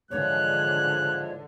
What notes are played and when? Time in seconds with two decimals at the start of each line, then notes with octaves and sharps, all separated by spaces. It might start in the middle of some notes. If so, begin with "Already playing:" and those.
0.11 G#2 D3 E3 F3 G#3 C#5 F#6